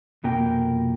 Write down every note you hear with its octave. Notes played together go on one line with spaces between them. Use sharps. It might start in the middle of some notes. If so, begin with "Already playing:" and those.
C2 F2 B2 A#3 A#4 G5